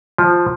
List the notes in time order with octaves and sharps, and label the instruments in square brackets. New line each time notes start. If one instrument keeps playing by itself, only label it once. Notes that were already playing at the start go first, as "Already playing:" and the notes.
[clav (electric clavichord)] F3